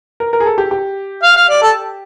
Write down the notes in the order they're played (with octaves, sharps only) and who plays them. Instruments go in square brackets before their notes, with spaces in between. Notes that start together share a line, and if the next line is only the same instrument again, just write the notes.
[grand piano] A#4
A#4
G#4
A4
G4
G4
[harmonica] F5
F5
D5
A4